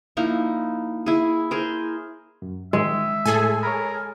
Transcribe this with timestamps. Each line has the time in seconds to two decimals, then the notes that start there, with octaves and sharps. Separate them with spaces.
0.17 F3 A#3 D#4 E4
1.06 E4 G#4
1.51 G#4 A#4 C5
2.42 F#2
2.73 D#3 G#3 E5
3.26 A2 G#4 A4 G#5
3.63 A#4 C#5 A#5 B5